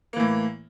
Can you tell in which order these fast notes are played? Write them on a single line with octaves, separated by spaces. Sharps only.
A#3 E3 A2